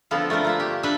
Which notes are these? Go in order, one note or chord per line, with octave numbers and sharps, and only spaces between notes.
D3 F3 B3 C4 F4 A4
A3 D4 F4 A#4
A#3 F4 E5
G4
D4 A4 B4 E5 F5